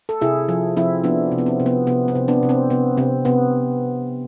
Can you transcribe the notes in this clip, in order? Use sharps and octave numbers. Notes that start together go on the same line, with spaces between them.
A4
C3 E4 G#4
F3
F3 C4 E4
F3 B3 D4
C3
B3
C4
C3
B3
C3 B3
C4
C3
B3 D4
C3
C4
C3 B3
C3 C4
C3 B3